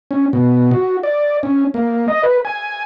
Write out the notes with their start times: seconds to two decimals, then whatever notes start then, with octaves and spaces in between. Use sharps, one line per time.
0.11 C#4
0.33 B2
0.71 F#4
1.03 D5
1.43 C#4
1.74 A#3
2.08 D#5
2.23 B4
2.45 G#5